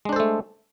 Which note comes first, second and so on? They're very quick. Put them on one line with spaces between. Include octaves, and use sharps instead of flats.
G#3 D4 C5 A4 A3